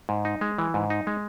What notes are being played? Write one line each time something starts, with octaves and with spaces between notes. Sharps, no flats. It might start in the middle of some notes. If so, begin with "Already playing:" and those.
G#2
D#4
G#3
E3
G#2
D#4
G#3